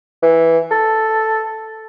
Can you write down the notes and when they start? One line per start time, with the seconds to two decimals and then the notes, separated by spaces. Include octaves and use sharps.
0.22 E3
0.71 A4